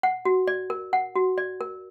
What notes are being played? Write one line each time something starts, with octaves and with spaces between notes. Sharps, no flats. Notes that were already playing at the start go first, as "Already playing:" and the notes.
F#5
F#4
D5
A#4
F#5
F#4
D5
A#4